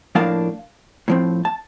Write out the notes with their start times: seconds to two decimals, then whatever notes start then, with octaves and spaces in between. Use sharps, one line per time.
0.15 A2 F3 A#3 D4 F5 A5
1.08 A2 F3 C4
1.45 A5